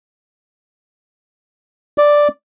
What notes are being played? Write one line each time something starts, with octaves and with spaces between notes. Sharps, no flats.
D5